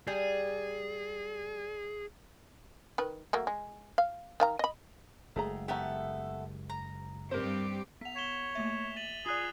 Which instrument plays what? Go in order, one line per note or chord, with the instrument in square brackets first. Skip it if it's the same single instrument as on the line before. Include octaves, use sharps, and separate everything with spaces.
[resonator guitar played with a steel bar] G3 [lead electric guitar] G#4
[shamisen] D#3 B4
F#3 A3 A#3
G#3
F5
D#3 F5 A#5
D#5 B5
[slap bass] F#1 G#3 [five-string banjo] A3 G#4 A#5
[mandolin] A3 B3 A4 [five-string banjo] G4 A#5
[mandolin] A#5
[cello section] G2 C4 G4 [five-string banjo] A#4 C5
[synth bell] B3 F#5 [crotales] B6 F7
[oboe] C#5 [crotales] B6 E7 G7
[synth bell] A3 A#3 E5
[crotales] A6 D#7 F#7
[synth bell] F4 D5 [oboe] G#4 [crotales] D#6 F#6